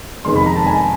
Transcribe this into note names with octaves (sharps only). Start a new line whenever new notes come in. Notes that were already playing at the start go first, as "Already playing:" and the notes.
F2 C3 D#3 G#3 B3 C6
B5
A#5
A5
G#5